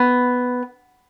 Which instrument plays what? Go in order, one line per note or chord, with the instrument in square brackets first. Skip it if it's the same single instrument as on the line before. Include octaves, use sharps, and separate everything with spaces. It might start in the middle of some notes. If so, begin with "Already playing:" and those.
Already playing: [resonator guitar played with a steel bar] B3